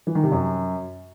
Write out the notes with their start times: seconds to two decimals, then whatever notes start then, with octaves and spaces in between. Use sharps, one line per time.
0.07 E3
0.15 D#3
0.24 C3
0.32 F#2